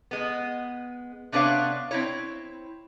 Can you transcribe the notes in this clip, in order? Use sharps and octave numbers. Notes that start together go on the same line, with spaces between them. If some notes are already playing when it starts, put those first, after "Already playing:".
G#3 B3
C3 B3 D4 B4 C#5 F5
C4 E4 C#5